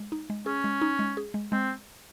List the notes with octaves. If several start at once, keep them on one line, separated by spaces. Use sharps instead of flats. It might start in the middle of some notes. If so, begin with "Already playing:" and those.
Already playing: G#3
D#4
G#3
C#4 G#4
G#3
D#4
G#3
G#4
G#3
G#3 C4